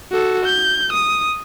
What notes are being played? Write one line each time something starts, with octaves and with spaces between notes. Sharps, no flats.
F#4 A4
G6
D#6